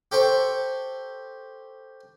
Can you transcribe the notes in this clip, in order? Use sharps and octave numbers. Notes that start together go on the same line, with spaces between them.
G4 A4 C5 C#6